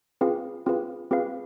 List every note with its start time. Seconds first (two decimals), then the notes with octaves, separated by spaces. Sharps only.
0.21 C4 F4 G#4 B4 F5
0.66 C4 F4 G#4 B4 F5
1.11 C4 F4 G#4 B4 F5